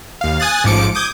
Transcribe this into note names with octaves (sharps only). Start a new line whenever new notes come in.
D#2 F5
G#5 D#6 F#6 A6
A1 G#2 F3 D6 C#7 D7
D6 D#6 G6 G#6